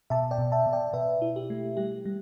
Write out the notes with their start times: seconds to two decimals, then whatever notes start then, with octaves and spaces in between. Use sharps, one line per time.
0.10 B2 E5 A5
0.31 D5 G5
0.38 B2
0.52 E5 A5
0.66 B2
0.73 D5 G5
0.93 B2 B4 E5
1.22 E4
1.36 G4
1.50 A3
1.77 G3 G4
2.06 G3